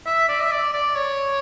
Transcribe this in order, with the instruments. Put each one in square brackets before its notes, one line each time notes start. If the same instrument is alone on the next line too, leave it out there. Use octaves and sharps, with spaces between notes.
[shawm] E5
D5
E5
D5
D5
C#5